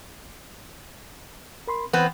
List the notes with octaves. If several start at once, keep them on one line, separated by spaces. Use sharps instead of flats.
A#4 B5 C6
E3 B3 C4 F#6